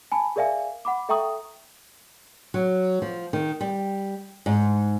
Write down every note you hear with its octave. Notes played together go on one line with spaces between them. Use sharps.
G#5 A5 B5
G#4 A#4 D5 E5 F5 G#5
F#5 B5 D6
A4 E5 G5 A#5 C#6 D#6
F#3
F3
D#3
G3
G#2